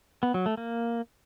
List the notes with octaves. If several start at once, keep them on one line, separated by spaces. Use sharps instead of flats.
B3
F#3
A3
A#3